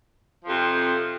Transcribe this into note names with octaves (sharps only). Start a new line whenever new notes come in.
F2 C3 F3